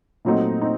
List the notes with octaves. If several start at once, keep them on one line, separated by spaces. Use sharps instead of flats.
A#2 F#3 A3 C4 D#4
C4 D#4